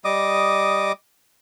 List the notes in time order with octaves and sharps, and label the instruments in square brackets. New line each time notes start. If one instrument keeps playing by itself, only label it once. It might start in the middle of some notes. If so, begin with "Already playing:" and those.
[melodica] G3 D#5 D6 D#6